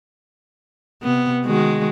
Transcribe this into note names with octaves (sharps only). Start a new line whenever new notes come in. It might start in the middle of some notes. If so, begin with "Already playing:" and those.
C3 B3
D#3 G#3 F#4